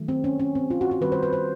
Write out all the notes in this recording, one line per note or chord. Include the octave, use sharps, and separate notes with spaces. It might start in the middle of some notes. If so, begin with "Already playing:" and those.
Already playing: D#3 F#3 A3
C4
C#4
C#4
C4
F4
F#4
F#4
D#3 G3 C4 B4
C5
B4
C5